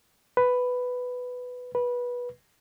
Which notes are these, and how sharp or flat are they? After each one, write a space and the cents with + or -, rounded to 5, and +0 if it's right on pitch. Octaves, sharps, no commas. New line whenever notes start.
B4 +10
B4 -15